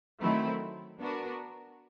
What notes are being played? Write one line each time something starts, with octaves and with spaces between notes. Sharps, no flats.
D#3 F#3 A3 C4 E4
B3 D4 F#4 A#4